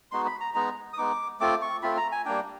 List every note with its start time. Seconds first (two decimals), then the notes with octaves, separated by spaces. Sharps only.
0.12 G#3 B3 D#4 F#4 C6
0.26 B5
0.40 A#5
0.54 G#3 B3 D#4 A#5
0.93 D#6
0.98 G#3 B3 D#4 D6
1.40 A3 C4 F4 D6
1.62 C#6
1.83 A3 C4 F4 B5
1.97 A#5
2.12 G#5
2.25 G3 A#3 D4 G5